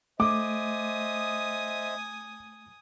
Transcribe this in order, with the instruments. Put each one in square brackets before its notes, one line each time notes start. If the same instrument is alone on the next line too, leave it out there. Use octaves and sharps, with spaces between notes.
[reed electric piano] A3 [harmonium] C5 D#5 E5 [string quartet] G#5 D#6 [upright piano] D6